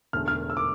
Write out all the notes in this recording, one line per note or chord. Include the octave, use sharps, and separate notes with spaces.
E1 E2 D3 A3 F6
F6
E6
D6